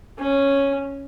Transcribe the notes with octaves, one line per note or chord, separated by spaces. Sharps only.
C#4